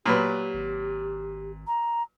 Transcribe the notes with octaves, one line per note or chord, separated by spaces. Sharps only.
A#2 F#3 G4 B4
G#1
A#5